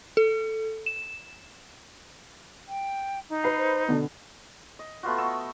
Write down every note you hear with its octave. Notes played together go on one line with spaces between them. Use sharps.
A4
E7
G5
D#4
B4 C7
C5
B2 D3 B3
D#5
A3 B3 F4 F#4
D#5 C#6 E6